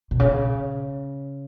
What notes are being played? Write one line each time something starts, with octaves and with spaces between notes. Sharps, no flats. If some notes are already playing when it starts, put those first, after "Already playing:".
B2
C#3